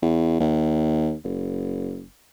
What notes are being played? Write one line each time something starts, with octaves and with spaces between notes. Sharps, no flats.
E2
D#2
F#1